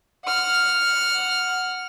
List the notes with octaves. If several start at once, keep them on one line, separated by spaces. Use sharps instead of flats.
F#5 F6